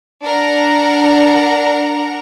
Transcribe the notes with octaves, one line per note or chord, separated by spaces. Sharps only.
D4 A#4 F#5 A#5